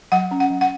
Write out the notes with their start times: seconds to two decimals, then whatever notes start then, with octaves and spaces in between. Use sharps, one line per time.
0.12 F#3 F#5
0.31 C#4
0.40 F#5
0.50 F#3
0.61 F#5